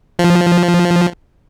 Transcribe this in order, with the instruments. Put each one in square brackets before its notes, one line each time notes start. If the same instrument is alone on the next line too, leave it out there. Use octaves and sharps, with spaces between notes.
[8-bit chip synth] F3